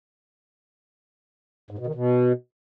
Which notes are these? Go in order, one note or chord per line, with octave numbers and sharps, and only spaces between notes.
G#2
B2
D#3
B2